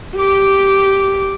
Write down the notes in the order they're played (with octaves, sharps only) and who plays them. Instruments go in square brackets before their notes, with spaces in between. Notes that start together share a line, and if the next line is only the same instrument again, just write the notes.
[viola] G4 D6